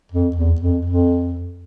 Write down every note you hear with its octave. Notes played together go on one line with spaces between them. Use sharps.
F2
E2
F2
F2